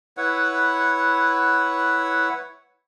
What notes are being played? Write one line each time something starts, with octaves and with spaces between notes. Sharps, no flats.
E4 B4 C#5 F#5